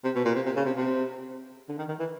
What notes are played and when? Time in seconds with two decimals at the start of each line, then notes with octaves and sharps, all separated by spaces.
0.04 C3
0.15 B2
0.25 A#2
0.35 C3
0.46 C3
0.56 C#3
0.66 C3
0.76 C3
1.69 D3
1.78 D#3
1.89 D#3
1.99 E3